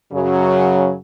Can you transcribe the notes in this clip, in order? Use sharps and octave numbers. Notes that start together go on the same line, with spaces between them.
F#2 C#3 F#3